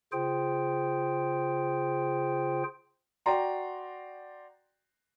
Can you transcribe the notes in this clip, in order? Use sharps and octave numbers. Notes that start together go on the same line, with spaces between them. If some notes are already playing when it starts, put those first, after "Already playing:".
C#3 F4 G#4 C5 G5
F#4 D5 G5 A#5 C6